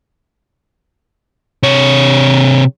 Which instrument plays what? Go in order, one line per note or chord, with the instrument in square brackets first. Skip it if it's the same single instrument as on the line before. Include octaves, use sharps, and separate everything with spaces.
[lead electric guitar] C3 C#5